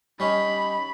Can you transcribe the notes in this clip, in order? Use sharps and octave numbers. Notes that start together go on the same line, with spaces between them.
G3 C#4 D#4 B5